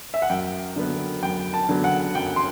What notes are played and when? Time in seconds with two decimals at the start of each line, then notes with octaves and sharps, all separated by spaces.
0.14 E5
0.22 F#5
0.30 F#2 G5
0.76 D3 F#3 B3
1.23 F#2 G5
1.54 A5
1.69 D3 F#3 B3
1.84 F#5
2.15 F#2 G5
2.36 C6